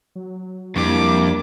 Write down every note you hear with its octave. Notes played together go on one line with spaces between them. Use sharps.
F#3
F2 G3 A#3 D4 E4 D6